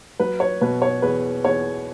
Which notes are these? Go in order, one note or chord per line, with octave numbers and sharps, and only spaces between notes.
F#3 B4
C#5
B2 B4
C#5
E2 B4
E2 C#5